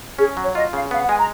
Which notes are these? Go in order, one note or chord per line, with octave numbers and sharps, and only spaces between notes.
C#4 G#4
F#3
C#5
F4 D#5
C#3 F5
B3 F5
F#5
G#3 G#5
A#5